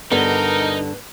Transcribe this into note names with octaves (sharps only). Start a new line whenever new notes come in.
G2 D3 G3 B3 D#4 A#4